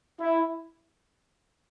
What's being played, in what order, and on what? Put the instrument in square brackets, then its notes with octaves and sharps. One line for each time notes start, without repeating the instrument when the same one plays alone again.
[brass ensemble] E4